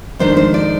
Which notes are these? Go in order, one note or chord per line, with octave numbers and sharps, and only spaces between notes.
F2 D#3 G#3 D4 C5
C5
D5